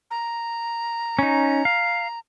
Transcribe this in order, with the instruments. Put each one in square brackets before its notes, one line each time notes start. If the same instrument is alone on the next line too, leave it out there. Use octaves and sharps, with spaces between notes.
[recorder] A#5
[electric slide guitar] C#4 D#4
F5